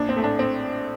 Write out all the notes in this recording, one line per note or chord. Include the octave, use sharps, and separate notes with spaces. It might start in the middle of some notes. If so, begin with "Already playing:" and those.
Already playing: A#1 D4
C4
A2 A3
D4
C4